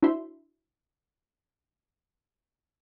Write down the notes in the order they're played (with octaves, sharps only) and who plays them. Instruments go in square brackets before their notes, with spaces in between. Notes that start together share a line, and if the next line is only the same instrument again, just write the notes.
[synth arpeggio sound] D4 E4 F#4 C5 E5 C6